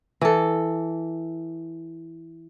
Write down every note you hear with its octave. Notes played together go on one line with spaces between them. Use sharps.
E3 A4